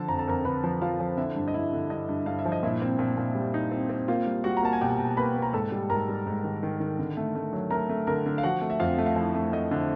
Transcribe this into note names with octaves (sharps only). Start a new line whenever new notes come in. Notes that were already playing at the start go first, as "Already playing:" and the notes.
Already playing: D3 F3 A4 A5
F2 A#5
A5
F2 A#4 A#5
D3 B4 B5
F3
F3 F4 F5
F3
D3 E4 E5
G2
D#5
G2 E4 E5
D3
G2 D#5
G2
G2 F5
E5
F3
D#5
A#2 E4 E5
C4
A#2
A#2
G3
D#4
C4
C4
A#3 F4 F5
G3
G3 F#4 F#5
A#5
A#3 A5
G#5
B2 G4 G5
B2
A#3 B4 B5
A#3
A#5
G#2 A4 A5
G3
G#2 A#4 A#5
G3
G#2
D#3
D#3
D#3
D3
A3
A3
F#3
A3 A#4 A#5
A3
D3 A#4 A#5
D3
F5
F3 F#4 F#5
A3
E5
F2 F4 F5
A3
F5
F3 E4 E5
A3
A3 D#5
D3